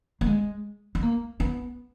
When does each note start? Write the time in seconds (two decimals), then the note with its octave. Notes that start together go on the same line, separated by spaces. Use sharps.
0.21 A#3
0.26 G#3
0.95 B3
1.02 A#3
1.40 B3